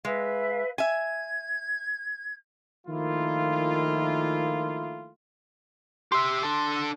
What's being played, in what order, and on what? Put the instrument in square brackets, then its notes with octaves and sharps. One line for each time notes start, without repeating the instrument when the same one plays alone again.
[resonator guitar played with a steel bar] G#3 [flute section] B4 E5 F5
[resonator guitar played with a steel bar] E5 G#5 [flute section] G#6
[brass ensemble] D#3 F3 A3 A#3 E4 F4
[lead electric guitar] G4 E5 [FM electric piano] C6
[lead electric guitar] D4 A4